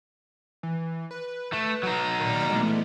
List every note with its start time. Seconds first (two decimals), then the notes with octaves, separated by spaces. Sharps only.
0.63 E3
1.11 B4
1.53 A3
1.83 F#3 D#4
2.19 A#2 D#3 D5 F6
2.50 E3 G#3 A3 B3